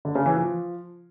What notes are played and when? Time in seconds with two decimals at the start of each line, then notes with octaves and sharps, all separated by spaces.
0.05 D3
0.15 C#3
0.26 E3
0.36 F3